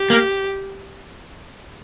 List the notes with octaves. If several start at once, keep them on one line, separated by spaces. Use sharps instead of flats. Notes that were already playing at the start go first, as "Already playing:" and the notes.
Already playing: G4
A#3